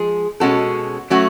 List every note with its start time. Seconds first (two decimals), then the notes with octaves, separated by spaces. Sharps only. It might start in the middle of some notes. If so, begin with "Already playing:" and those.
Already playing: F3 G#3 G#4
0.40 B2 G#3 C#4 F#4 A4
1.10 F#3 A3 C#4 F#4